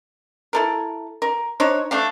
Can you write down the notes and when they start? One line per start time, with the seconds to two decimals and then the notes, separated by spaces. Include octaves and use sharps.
0.53 E4 A4 A#4
1.22 A#4
1.60 D4 D#4 C5 C#5
1.91 A3 D4 F5